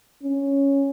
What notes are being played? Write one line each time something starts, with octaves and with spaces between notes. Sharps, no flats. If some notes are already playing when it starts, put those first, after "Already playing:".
C#4